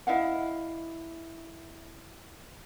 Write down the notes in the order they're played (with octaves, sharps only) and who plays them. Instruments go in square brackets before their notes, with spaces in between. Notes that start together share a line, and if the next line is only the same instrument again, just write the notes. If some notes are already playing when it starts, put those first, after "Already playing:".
[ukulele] E4 D#5 F5 F#5